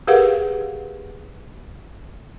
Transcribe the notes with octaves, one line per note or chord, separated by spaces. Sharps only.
G4 G#4 A#4 B4 F5 F#5